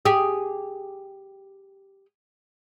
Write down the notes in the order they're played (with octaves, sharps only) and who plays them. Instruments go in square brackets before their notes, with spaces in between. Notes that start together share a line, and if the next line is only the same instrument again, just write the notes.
[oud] G4 G#4